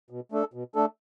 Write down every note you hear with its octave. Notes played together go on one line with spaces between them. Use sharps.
B2
A3 D4 A4
B2
A3 D4 A4